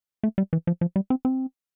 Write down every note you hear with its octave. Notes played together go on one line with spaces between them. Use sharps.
A3
G3
E3
F3
F3
G3
C4
C4